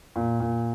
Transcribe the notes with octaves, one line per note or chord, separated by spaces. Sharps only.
A#2
A#2